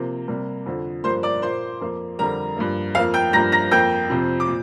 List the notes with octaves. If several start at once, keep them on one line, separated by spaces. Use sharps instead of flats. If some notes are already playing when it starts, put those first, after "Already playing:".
Already playing: C3 F3 A#3
C3 G3 A#3
F2 D3 F3
G2 F3 A#3 C5 C6
D5 D6
A#2 A#3 C5 C6
F2 F3 A#3
F2 D3 G3 A#4 A#5
G2 F3 A#3
F2 F3 A#3 F5 F6
G5 G6
G2 F3 A#3 A#5 A#6
A#5 A#6
F2 F3 A#3 G5 G6
F2 C3 F3
D6
A#2